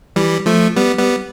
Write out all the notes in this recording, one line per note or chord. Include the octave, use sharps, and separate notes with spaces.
E3 G3
F3 A3
G3 B3
G3 B3